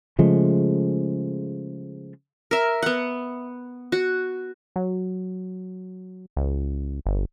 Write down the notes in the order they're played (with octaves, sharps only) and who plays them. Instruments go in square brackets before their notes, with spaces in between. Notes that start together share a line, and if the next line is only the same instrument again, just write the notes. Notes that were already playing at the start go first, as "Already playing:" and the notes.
[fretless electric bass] C#3 F3 G#3 A3
[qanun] A#4 E5
B3 F#5
F#4
[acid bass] F#3
C#2
G1